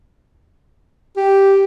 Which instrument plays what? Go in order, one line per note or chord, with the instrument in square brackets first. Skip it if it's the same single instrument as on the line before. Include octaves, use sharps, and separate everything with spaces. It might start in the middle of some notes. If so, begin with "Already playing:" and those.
[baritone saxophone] G4